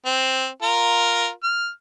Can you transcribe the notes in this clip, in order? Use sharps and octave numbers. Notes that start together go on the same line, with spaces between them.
C4
F4 A#4
F6